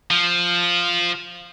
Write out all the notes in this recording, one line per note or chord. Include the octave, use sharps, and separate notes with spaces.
F3